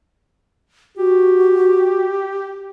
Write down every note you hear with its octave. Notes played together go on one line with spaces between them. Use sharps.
F#4 G4